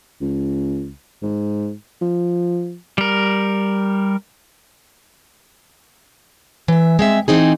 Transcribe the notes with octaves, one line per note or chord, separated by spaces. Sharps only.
C#2
G#2
F3
G3 A#4
E3 E5
G#3 C4 E5
E3 C4 D#4 G#4